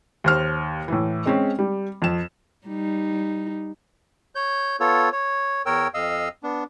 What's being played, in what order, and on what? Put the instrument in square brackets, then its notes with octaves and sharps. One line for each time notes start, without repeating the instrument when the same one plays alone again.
[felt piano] D#2 C5 F6
A2 E3
G#3 C4 C#4
G3
F2 E7
[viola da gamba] G3 D#4
[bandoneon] C#5 G6
B3 F4 A4 C#5
C#5
E2 A#4 C#5 G5 E6
F2 D#5 F5 E6
B3 D4